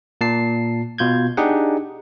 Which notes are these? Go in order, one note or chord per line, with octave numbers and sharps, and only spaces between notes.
A#2 A5 C7
B2 F4 G6 G#6
D4 D#4 G4 G#4 F#5